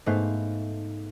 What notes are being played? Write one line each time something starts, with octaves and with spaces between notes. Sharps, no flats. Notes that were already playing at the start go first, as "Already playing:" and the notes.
G#2 A3 B3 C5 F5